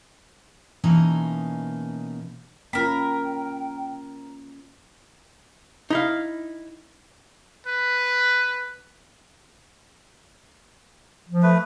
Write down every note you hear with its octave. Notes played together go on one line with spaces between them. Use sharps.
B2 E3 A#3 C#4 D#4 A#5
A#3 C#4 F4 A#4 G5 B5
D#4 E4 F5
B4
F3
A3 B4